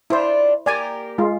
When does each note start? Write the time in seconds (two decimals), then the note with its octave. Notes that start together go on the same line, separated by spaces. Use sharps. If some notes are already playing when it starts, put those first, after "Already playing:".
0.10 D4 E4 F4 C5
0.66 A#3 G4 A#4 D5 G#5
1.18 G#3 F4